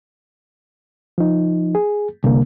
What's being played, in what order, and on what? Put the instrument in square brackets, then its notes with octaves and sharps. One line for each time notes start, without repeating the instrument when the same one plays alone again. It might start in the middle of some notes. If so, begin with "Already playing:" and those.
[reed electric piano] F3 D#4
G#4
[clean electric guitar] C2 [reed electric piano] D3 A#3